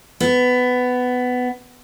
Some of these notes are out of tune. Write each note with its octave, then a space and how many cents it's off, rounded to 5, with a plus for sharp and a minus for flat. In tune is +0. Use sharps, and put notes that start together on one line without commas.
B3 +15